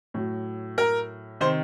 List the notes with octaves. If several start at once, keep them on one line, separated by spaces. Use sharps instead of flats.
A2 F#3
A#4
C3 D#3 C5